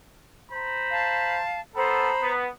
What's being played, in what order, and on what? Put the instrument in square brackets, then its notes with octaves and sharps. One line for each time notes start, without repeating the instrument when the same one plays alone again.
[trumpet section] C5 A#5 B5
[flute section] F5 A5
[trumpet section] B3 A4 [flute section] C5 A#5 B5
[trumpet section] B3